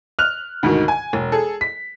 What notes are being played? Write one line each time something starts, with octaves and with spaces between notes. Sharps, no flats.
F6 F#6 F7
D2 G#2 B2 D#3
G#5
E1
G#4 A4
B6